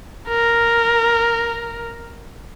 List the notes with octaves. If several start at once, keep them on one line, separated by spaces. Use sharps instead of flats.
A#4